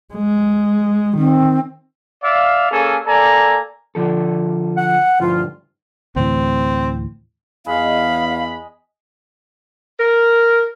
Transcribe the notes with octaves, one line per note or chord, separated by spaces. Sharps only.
G#3
D#3 C4
D5 E5 F5
A#3 C#4 G#4 A4
A#3 A4 D5 G#5 A#5
D3 F3 A4
F#5
D2 G2 F3 E4 F4
D2 A2 E3 C4
E2 G#3 G#4 D#5 F5 B5
A#4